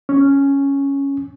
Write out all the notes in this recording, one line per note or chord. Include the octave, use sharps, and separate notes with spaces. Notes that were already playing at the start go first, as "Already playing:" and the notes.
C#4